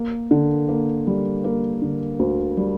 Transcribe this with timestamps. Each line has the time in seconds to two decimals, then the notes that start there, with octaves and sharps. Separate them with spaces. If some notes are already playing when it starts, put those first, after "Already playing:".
Already playing: A#3
0.31 D3
0.69 A#3
1.07 G3
1.44 A#3
1.82 D3
2.19 D2
2.57 G3